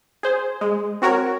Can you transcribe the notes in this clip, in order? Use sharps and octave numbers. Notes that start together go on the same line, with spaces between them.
G#4 C5
G#3
C4 F#4 A#4 C#5